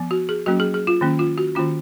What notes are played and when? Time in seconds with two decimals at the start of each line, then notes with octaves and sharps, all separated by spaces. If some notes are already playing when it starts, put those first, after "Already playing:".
Already playing: F3 B3
0.11 F#4
0.29 G#4
0.46 F#3 A#3 C#4 F#4
0.60 G#4
0.74 G#4
0.87 F4
1.01 D#3 A#3 C#4
1.19 F4
1.38 F#4
1.55 D#3 A#3 C#4 F4